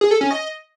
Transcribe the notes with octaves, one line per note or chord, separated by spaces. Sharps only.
G#4
A4
C#4
D#5